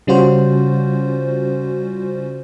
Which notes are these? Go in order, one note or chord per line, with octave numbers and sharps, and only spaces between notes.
C#3 G3 C#4 F4 F#4 C5